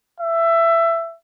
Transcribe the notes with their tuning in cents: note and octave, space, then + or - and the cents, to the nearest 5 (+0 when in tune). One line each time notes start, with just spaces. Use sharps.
E5 +20